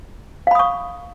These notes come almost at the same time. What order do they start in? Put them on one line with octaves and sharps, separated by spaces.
F5 B5 D#6 C#6